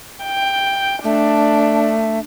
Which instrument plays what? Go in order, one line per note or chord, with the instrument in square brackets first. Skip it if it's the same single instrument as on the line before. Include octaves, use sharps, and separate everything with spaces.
[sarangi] G5
[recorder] A3 [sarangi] D4